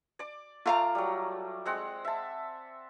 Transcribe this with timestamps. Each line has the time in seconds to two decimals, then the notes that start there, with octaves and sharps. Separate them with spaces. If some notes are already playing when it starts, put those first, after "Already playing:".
0.19 D5 D6
0.66 A3 F4 D5 F5 A#5
0.95 F#3 G3
1.66 G#3 C4 F#5
2.04 E5 A5